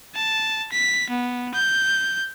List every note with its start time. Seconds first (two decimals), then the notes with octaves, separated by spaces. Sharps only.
0.15 A5
0.72 B6
1.10 B3
1.55 G6